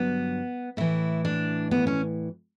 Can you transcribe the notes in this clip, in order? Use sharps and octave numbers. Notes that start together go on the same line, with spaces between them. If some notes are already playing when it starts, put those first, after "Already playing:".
Already playing: G2 D3 F#3 B3
A2 E3 E4
D4
B3
C#4